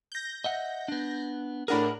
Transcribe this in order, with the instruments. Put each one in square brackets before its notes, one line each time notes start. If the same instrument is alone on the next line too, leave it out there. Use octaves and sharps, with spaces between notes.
[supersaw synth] G6 A#6
[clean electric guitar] D#5 E5 F#5
B3 D4
[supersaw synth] A2 D4 A#4 [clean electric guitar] G#4 F#5 B5